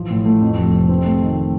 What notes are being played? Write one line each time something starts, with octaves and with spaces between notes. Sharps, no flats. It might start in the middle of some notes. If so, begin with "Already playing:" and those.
Already playing: A1 F3
A2
A3
F2
F1
C3
C4
A3
D#3